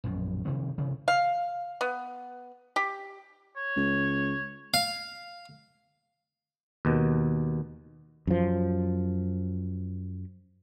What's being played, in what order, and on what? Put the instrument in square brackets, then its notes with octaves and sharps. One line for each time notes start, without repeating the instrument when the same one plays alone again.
[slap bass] A#1 F#2 B2
C3 D#3 F3 B3
D2 C3 D#3 E3
[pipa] F5
B3
G4
[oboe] C#5
[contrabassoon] C#2
[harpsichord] F5
[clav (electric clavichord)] D#2 B2
[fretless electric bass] F#2 F3